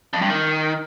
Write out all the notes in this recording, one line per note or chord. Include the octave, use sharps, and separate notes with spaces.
F2
G2
D#3